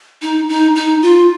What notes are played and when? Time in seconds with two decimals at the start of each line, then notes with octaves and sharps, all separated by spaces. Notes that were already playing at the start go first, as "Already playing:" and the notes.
0.22 D#4
0.49 D#4
0.76 D#4
1.02 F4